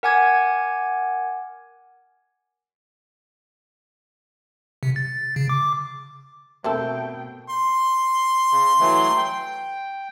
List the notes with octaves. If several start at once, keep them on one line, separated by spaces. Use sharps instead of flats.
A#4 F#5 G#5 D6 G#6
C3
A6
C#3
D6
B2 A3 C4 A4 A#4 E5 G5
C6
C#3
E3 F#3 A3
G5